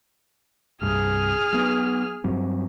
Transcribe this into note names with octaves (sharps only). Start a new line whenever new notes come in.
C2 G2 G#4 F6
F#3 B3
G2 F#3 C4